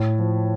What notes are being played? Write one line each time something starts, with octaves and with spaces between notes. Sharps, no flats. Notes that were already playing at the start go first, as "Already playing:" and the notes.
Already playing: A2
F3